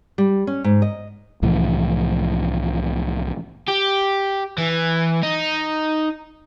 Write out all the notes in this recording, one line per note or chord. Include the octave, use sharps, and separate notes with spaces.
G3
C#4
G#2
D#5
C2 A2 E3 F3
G4
E3
D#4